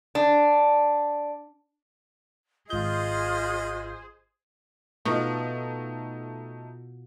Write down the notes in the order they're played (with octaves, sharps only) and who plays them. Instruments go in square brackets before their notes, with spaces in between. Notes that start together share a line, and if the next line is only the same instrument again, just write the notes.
[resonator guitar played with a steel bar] D4
[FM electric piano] G#1 G6 [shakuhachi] F4 [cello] G#4 C5 [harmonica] D#5
[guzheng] B2 [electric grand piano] A3 D#4 [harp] F4 F#4